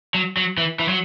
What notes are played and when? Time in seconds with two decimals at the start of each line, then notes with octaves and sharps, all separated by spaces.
0.14 F#3
0.37 F#3
0.58 E3
0.79 E3
0.89 F#3